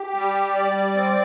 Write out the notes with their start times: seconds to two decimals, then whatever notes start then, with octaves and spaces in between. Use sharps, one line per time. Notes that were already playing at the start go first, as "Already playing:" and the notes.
Already playing: G4
0.14 G3
0.55 D5
0.96 C4